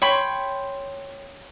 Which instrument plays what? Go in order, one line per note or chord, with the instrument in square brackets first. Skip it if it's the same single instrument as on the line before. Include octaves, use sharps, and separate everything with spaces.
[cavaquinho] C#5 G5 B5 C6